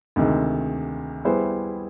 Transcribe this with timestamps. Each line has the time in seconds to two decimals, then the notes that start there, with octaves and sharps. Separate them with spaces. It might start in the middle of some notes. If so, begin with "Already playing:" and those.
0.16 D2 C3 D#3 G#3
1.25 G3 B3 E4 G#4 C5